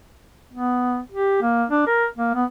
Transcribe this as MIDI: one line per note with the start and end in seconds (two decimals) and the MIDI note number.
0.53 0.99 59
1.12 1.37 67
1.42 1.64 58
1.69 1.85 62
1.87 2.05 70
2.17 2.32 58
2.35 2.44 59